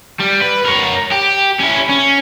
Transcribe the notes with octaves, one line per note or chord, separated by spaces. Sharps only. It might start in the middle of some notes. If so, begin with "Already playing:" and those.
G3
B4
A#4 C#5
G4
C#4 E4
C#4